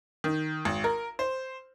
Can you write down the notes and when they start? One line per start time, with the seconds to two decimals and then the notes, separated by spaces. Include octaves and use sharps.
0.24 D#3
0.65 G#1
0.84 A#4
1.19 C5